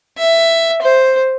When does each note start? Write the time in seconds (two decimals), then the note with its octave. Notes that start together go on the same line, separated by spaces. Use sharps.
0.18 E5
0.82 C5